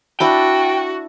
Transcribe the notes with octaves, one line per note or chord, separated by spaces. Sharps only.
D4 E4 F#4 D5 G5